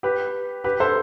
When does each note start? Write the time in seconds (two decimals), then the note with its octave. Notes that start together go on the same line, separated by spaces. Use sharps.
0.03 G4 B4
0.64 G4 B4
0.80 A4 C5